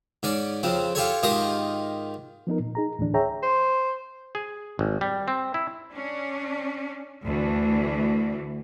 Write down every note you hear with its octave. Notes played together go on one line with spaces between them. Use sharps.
G#2 C#4 D5
F2 C#3 C4
F4 G4 A4 C#5
G#2 D#3 F4 G4 D#5 D#6
F3 B3 D#4 A#4
A#2
D#4 G#4 A#5
D2 A2 E3 D4
G#4 C#5 E5 G5 A#5
C5
G#4
G#1
G3
C4
E4
C#4 D4
D2 E3